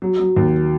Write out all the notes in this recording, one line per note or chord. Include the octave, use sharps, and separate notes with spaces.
F#3
F#3
D#2